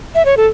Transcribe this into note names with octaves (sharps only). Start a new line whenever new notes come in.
E5
C#5
A4